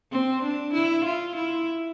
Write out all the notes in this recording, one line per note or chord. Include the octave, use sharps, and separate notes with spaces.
C4
D4
E4
F4
E4